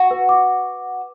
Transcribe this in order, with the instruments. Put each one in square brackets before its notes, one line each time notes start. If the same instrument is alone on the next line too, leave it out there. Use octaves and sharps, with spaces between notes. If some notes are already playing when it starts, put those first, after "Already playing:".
Already playing: [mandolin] F#4 [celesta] F#5
[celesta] B4
D6